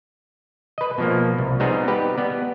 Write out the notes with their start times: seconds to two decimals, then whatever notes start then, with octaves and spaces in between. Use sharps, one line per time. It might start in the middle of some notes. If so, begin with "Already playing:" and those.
0.78 B4 D#5
0.98 B2 F3 A#3
1.39 C2
1.60 G3 B3 C4 D#4 G#4
1.88 G4 B4
2.18 B3 D5